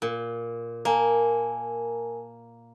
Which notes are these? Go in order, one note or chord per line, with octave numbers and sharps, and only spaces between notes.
A#2
A#3 A#4 G#5 A5